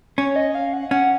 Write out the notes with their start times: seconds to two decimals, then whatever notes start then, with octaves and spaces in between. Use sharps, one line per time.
0.18 C#4 C#5
0.36 D#5
0.55 F5
0.73 F#5
0.91 C#4 F#5